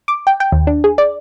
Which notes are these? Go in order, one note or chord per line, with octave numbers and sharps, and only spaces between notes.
D6
G5
G5
D#2
D4
G#4
D5